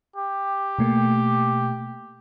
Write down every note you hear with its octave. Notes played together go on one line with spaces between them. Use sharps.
G4
B2 A3 A#3